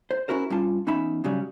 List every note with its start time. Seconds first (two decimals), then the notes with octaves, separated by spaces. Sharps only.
0.11 C5
0.28 C#4 E4 F#4 A#4 C5
0.50 G2 C#4 F4 A5
0.87 E2 C#4 D#4 E5 B5
1.24 G#2 C#3 F#3 G3